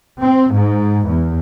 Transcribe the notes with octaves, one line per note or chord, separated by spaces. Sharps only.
C4
G#2
E2